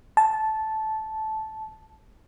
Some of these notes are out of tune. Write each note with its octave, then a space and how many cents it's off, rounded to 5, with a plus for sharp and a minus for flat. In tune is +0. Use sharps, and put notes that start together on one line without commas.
A5 -10